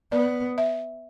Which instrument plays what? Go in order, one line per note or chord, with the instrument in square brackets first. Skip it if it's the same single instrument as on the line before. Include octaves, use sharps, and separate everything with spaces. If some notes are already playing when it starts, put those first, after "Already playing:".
[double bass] B3 [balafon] D5
[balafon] E5